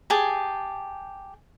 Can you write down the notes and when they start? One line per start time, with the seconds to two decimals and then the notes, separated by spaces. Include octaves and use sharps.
0.10 G4 G#4 G#5 A5